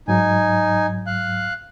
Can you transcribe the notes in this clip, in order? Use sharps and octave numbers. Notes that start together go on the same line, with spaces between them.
G#2 F#3 D#4 G#5
F5 F#6